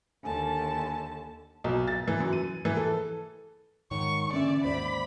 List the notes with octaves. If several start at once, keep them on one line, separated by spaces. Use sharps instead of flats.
D#2 D3 G#5 A5
B1
A6
E3
F#2
D#7
E3
A4
G#2 D#3 C#5 C#6
D3 E3 C#4 D5 E5
D#2 G#2 C5 D5 E5 B5